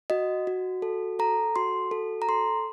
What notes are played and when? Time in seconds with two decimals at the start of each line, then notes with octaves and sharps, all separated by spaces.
0.10 F#4 D#5
0.47 F#4
0.82 A4
1.19 A4 A#5
1.56 F#4 C6
1.91 A4
2.22 A#5
2.29 A4 C6